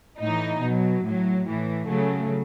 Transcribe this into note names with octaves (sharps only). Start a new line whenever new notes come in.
A2 E3 D#4
B2 F#3
A2 F#3
A2 E3
C#3 F#3 A3